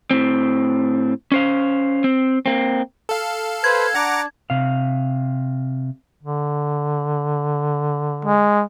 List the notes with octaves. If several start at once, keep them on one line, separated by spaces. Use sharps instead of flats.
A2 C4
C#4 C5 F5
C4
A#3 C4
A4 F5
B4 C5 G#6
D4 F#5 A#5 D6
C3 F5
D3
G#3